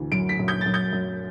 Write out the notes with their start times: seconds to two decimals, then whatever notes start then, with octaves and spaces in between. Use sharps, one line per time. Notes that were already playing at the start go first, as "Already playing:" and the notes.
Already playing: D2 E3
0.12 F#2 D7
0.29 B6
0.39 F#2
0.48 G6
0.61 F#2 A6
0.74 G6
0.93 F#2